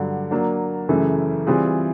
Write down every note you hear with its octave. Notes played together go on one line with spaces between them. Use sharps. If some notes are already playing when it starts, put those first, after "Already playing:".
Already playing: G2 D3 F#3
F#3 A#3 D4
F#2 C#3 E3 A3
E3 G3 C4 F4 G#4